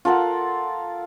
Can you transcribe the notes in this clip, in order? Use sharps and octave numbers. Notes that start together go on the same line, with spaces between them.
F4 A4 A#4 F#5